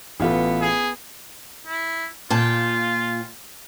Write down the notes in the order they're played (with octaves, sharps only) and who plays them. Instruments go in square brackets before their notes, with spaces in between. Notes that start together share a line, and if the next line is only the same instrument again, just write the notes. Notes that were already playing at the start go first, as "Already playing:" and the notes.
[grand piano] A1 F4 A4 [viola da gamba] B3
[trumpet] G#4
[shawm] E4
[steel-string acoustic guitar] A#2 G5 A5 [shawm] F4